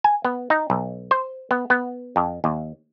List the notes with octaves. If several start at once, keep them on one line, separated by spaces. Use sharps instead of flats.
G#5
B3
D#4
B1
C5
B3
B3
F2
D#2